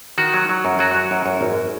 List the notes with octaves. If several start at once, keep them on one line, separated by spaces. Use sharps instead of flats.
D#3 F#4
F#3
F#3
F#2
F#3 F#4
F#3
F#2
F#2
G#1